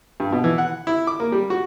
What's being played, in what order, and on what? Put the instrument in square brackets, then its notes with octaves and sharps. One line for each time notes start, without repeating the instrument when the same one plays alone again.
[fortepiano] G2
B2
E3
F#5
E4
D6
A#3
G3
F#4